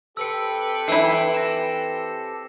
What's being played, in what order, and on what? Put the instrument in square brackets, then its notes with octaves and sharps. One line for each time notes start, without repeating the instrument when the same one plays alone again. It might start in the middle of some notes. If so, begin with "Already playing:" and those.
[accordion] C4 G4 A4 [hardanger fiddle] B4 G5 [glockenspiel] E6 C#7
[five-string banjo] E3 E4 [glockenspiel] E6 C7
[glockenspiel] A#6 E7